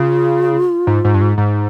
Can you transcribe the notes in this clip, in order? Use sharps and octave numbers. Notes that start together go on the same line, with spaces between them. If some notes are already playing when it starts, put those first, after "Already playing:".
Already playing: C#3 F4
G#2
G#2
G2
G#2
G#2